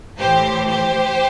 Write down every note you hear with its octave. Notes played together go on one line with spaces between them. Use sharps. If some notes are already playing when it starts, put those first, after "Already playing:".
A2 E3 G4 C5
G4 C5